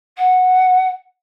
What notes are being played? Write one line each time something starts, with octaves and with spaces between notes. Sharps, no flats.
F#5